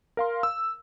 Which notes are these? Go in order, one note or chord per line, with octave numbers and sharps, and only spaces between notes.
A#4 F5 C6
E6